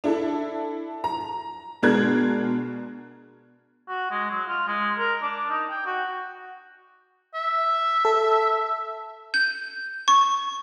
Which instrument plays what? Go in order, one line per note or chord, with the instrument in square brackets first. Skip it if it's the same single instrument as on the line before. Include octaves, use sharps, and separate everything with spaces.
[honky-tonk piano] D4 E4 A4
A#5
B2 G#3 D4 A#4 F#6 G#6
[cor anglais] F#4
G#3
F#3
F4
G#3
A#4
D4
D#4
G5
F#4
[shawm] E5
[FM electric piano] A4
[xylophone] G6
C#6